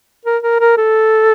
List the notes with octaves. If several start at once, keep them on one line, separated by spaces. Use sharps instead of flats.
A#4
A#4
A#4
A4